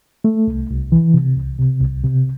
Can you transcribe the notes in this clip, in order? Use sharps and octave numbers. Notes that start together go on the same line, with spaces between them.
A3
C2
C2
E3
C3
C2
C3
C2
C3